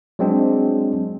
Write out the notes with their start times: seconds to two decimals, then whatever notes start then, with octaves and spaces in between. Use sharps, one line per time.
0.19 F#3 G#3 C4 D4